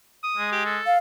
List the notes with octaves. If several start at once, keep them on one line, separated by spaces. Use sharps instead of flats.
D#6
G#3
G4
A4
F5